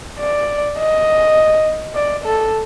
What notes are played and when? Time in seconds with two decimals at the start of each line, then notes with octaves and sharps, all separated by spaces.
0.20 D5
0.78 D#5
1.95 D5
2.25 A4